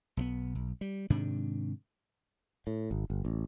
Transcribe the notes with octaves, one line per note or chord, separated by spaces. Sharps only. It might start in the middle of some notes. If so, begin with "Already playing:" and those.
B1 D#3 B3
B1
G3
G#2 C3 D#3 D4
A2
G#1
G1
A1